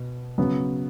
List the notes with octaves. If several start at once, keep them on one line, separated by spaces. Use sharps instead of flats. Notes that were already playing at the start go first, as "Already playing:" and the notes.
Already playing: B2
C#3 F#3 B3